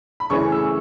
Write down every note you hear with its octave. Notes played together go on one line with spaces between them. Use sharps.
B5
C#3 E3 A3 C#4 C#6
E6